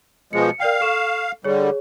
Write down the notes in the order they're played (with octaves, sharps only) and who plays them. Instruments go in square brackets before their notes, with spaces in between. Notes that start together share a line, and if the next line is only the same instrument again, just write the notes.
[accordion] B2 F3 G#3 [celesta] C#7
[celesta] A#4 D5 G5 [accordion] F5
[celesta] A4 C#6 E7
[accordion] D3 G3 [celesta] G#4 C#5